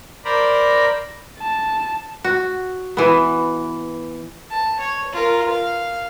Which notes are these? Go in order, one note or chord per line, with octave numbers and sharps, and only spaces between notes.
A#4 C5 D5 A#5 B5
A5
F#4
E3 B3
A5
C#5
F4 A#4
F5